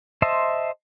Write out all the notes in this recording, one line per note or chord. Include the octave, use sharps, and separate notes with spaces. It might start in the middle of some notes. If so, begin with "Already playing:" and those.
C5 D#5 E5 A5 C6